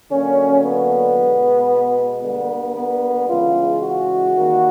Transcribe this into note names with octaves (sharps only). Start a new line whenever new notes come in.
D3 F#3 A#3 C#4
B3
B2 G#3
D3 G3 A#3 B3
B3
C#3 E3 G#3 F4
F#4
D#3 G3 A#3